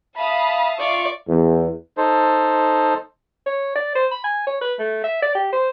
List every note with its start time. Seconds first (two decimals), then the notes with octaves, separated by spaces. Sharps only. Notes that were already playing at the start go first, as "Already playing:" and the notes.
0.17 E5 F5 A5 B5 D#6
0.79 F4 D5 C#6
1.27 E2
1.97 D#4 A4 C5
3.46 C#5
3.75 D5
3.95 C5
4.11 B5
4.24 G#5
4.47 C#5
4.61 B4
4.79 A3
5.04 E5
5.22 D5
5.35 G4
5.53 C5